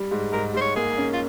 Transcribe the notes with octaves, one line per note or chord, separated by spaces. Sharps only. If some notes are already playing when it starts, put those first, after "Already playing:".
Already playing: G3
G#2
G#2 A#4
G#2 C5
C#5
A#3 G#4
C#4
F4